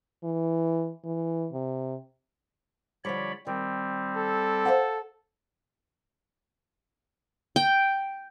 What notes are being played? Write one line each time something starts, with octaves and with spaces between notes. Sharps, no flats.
E3
E3
C3
D3 F3 G3 C#5 D5 B5
D#3 G3 C4
A4
C5 F5 F#5
G5